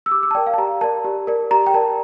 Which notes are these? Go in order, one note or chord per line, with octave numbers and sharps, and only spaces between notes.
E6
G4 D6
E6
A5
A#4 D5 G5
F5
A5
G4 A#5
A#4 D5 A5
G4
A#4 D5
G4 A#5
G5
A#4 D5 A5